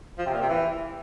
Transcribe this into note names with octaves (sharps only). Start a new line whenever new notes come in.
F3
C3
A#2
C3
E3